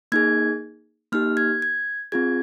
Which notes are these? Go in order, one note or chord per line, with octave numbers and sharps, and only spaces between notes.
A#3 D#4 G#4 G#6
A#3 D#4 G4 F6
G#6
G#6
C4 F4 G#4 G#6